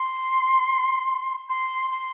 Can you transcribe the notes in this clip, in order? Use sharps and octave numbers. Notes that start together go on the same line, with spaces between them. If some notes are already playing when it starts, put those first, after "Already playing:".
Already playing: C6
C6
C6